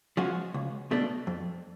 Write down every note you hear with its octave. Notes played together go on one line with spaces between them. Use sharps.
F3 G#3 C#4 F#4
C#2
B2 A3 D4
F2